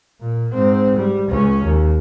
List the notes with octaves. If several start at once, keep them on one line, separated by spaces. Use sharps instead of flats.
A#2
G#2 C4
G3
C#2 C#4
D#2